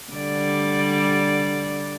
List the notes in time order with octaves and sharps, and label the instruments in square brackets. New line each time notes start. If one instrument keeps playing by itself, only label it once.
[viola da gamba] D3 G3 D5